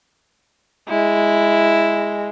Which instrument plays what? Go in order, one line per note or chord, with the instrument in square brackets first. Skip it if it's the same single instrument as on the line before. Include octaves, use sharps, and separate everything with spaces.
[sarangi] G#3 [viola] E4